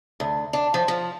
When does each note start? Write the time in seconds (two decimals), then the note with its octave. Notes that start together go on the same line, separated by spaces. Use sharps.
0.20 D2
0.53 D4
0.74 F3
0.88 F3